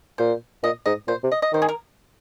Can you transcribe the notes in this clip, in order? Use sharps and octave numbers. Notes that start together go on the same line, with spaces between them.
A#2 C5
A#2 D#5
G#2 D#5
A#2 C5
C3
D#5
D#5
D#3 C5
G#4
A#4